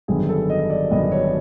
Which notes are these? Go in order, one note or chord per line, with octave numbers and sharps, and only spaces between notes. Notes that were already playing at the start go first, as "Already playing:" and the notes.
G#1 F#2 D3 G3 B3 G#4
A4
D#5
D5
G#1 F#2 D3 G3 B3 D#5
C#5